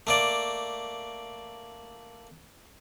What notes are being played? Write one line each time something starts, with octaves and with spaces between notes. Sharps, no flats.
A3 A#3 D5